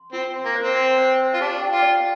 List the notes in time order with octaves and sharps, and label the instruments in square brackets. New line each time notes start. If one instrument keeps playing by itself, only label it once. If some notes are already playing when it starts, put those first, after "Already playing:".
Already playing: [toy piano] C6
[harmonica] C4 [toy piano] F4
[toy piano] C6
[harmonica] A#3
[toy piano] C5
[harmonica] C4
[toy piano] C6
C5
C5
[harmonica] F4
[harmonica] D4 [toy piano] G4
[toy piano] G5
[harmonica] F4
[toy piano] D5